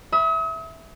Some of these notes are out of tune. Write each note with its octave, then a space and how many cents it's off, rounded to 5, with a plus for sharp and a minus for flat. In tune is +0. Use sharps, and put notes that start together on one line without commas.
E5 +0 B5 +0 D#6 +45